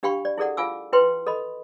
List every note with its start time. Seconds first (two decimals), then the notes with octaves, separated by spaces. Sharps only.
0.03 D4 G4 F5 G5 B5 C#6
0.25 D5
0.38 E4 G#4 A4 D5 F#5
0.57 F4 F5 G#5 D6 E6
0.93 E4 B4 G5 C6
1.27 A4 D#5 B5